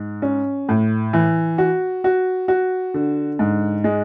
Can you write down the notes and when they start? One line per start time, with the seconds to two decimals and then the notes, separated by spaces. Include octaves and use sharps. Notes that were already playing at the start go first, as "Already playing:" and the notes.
Already playing: G#2
0.22 C#4
0.69 A2
1.13 E3
1.58 F#4
2.04 F#4
2.48 F#4
2.94 D3
3.39 G#2
3.84 G#3